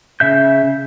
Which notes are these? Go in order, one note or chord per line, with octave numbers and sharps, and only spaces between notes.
C#3 E5 G6